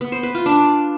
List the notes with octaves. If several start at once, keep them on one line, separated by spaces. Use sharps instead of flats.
B3
C5
B4
F4
D4